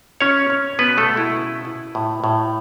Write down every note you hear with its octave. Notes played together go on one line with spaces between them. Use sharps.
C#3 C#4 C#5
C#4
B2 B3 B4
A3 A4
B2
E4
C#3
E4
A2
A2